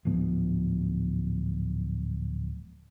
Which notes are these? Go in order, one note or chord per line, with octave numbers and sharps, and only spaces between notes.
D1 G#2 F3 B3